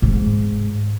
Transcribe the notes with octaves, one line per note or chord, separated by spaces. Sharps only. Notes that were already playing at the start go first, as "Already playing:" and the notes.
G#2